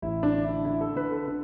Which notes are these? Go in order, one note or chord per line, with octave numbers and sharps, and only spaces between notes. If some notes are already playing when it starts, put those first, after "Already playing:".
A1 E4
D4
D3
E4
D3 E4
A4
D3 B4
A4
D3